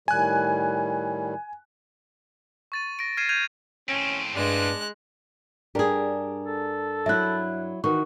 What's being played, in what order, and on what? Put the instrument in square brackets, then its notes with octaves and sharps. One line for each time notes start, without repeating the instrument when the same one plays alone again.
[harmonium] A2 D#3 G3 [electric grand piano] G#5 F#6
[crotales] C#6 A6 D#7
A#6 D7
F6 G#6 C7 D#7 E7
F6 G6 G#6 D#7 F7
[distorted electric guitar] A2 C4 [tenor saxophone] C#4
[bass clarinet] G2 [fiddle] G#3 F#6 [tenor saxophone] D4
[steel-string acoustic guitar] G2 D4 A#4 [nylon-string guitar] G4 G#4
[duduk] A4
[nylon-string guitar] F#3 E4 [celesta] E5 F#6
[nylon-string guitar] D#3 [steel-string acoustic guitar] E3 [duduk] F#4 [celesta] C#6